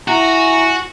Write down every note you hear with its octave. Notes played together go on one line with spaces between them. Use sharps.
E4 F#4 E5 G#5 A#5